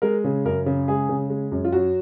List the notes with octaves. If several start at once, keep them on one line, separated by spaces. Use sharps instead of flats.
G#3 A#4
C#3
F#2 A#4
C#3
G#3 G#4
C#3
G#3
F#2
F4
F#3 F#4